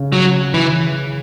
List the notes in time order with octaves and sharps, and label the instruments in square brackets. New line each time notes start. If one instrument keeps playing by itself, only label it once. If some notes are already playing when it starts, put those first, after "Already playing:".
Already playing: [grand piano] C#3
[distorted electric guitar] F#3
E3